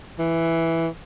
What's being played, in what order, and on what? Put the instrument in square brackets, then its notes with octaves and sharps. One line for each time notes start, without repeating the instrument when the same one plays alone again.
[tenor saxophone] E3